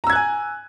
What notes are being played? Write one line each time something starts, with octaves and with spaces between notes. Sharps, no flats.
G#5 A#5 E6 F#6 G#6